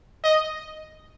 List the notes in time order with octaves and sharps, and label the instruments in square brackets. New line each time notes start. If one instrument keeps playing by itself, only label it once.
[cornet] D#5